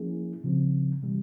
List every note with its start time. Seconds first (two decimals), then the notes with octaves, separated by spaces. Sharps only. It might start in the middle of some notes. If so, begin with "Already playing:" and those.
Already playing: F3 A#3 C#4 E4 G#4
0.44 C#3 F3 C4
1.03 C3 E3 G3